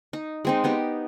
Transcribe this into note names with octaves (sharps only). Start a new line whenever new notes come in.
D#4
G#3 C4 D#4
B3 D#4 G4